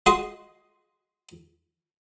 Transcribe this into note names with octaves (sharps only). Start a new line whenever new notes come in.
G#3 F#4 D#5 C6 D#6